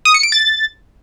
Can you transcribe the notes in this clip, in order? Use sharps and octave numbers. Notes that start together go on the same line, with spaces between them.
D#6
C#7
D7
A6